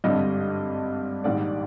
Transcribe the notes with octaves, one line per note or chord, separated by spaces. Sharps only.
G#1 G2 D3 G3 D#5
A#1 G#2 D#3 G3 D5